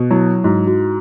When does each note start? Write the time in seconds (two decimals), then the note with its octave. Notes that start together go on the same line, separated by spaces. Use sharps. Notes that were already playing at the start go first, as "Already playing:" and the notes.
Already playing: B2 F#4
0.11 F#3 E4
0.44 G#2 F#4
0.67 F#4